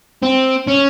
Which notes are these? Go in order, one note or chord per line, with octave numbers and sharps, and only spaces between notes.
C4
C#4